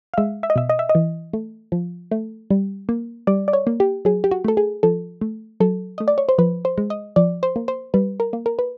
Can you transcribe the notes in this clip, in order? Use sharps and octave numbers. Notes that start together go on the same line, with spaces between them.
F5
G#3 E5
E5
D#5
B2 E5
D#5
E5
D#5
E3
A3
F3
A3
G3
A#3
G3 D5
D5
C#5
A#3
G4
F#3 G#4
G4
F#4
A3 A4
G#4
F3 A4
A3
F#3 A4
A3 D#5
D5
C#5
C5
F3 B4
C5
G#3
D#5
F3 D5
C5
A#3
C5
G3 B4
A#4
A#3
A#4
B4